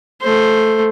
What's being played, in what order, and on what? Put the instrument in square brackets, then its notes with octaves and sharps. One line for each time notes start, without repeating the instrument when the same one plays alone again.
[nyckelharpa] A3 C5